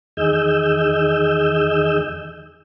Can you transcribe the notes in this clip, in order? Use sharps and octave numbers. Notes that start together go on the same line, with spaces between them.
E2 D#3 G#4 D#5 E6 G6